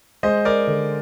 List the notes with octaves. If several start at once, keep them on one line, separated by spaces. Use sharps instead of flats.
G#3 C5 D#5
A#4 D5
D3